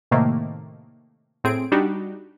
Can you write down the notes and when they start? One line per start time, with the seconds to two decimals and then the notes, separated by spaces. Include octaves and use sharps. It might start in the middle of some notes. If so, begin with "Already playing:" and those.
0.11 A2 C3 D#3 A3 A#3
1.44 A2 C4 G#4 D7
1.72 G3 D4 D#4 F#4 G4